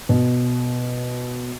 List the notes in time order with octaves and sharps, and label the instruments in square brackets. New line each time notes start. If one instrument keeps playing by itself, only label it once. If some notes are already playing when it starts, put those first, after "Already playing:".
[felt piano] B2